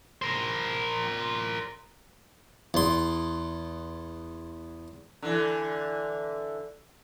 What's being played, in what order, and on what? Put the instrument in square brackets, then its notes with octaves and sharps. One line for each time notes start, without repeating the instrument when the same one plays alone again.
[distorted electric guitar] A#4 C5
[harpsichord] E2 C6
[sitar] D3 E3